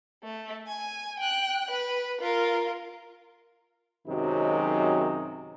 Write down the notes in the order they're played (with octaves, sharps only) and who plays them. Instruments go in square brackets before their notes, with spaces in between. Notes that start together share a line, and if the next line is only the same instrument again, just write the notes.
[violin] A3
G#5
G5 F#6
B4
F4 A#4
[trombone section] F#2 C3 D#3 F#3 G#3 D#4